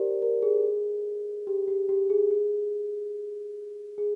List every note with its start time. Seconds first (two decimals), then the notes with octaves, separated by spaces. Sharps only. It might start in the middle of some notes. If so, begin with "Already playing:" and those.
Already playing: G4 A#4 C5 D5
0.22 A#4
0.42 G#4
1.47 G4
1.68 G4
1.89 G4
2.10 G#4
2.31 G#4
3.98 G#4